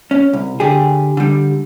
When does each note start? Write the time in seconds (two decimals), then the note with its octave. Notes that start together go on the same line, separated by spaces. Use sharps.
0.11 C#4
0.33 C2
0.60 D3 G4 G#4
1.17 D3 G3